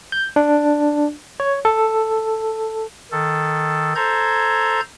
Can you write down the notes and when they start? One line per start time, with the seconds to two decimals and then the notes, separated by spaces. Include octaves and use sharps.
0.12 G6
0.36 D4
1.40 C#5
1.65 A4
3.12 D#3 A4
3.95 A4 C5 A#5 G6 G#6